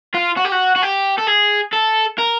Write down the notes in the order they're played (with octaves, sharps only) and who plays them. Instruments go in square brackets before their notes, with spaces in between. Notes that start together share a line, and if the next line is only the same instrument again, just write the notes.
[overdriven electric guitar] F4
F#4
G4
F#4
F#4
G4
A4
G#4
A4
A#4